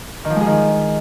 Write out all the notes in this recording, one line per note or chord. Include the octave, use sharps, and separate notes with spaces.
D#3
F3
G#3
G#4
D#3